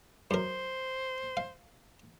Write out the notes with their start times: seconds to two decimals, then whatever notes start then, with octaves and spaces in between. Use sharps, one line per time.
0.31 F#2 A#4 C5
1.37 F5